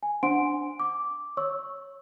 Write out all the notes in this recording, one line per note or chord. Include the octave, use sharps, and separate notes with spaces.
G#5
D4 C5 F#5 C6 D7
D6
C#5 C#6 E6